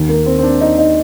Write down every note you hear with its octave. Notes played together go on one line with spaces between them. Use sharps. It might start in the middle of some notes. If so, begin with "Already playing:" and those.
Already playing: D#2 D#3
A#3
C4
C4
D4
D#4
D#4